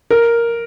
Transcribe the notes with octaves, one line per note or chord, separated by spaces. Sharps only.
A#4